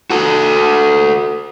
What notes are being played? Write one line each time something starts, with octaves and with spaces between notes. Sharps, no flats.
F#4 A4